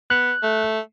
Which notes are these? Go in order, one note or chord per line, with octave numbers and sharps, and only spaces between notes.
B3 F#6
A3